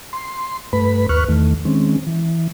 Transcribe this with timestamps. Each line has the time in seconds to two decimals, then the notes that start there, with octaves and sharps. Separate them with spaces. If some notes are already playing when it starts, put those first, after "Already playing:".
0.13 C6
0.73 G2 A3 B4 B5
1.09 D#2 B4 C#6 F6 F#6
1.28 E2 D#3 A3
1.65 D#3 G#3 C4 C#4
2.07 E3